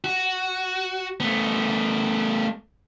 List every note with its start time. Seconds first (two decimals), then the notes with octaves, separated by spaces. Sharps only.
0.04 F#4
1.20 A3 B3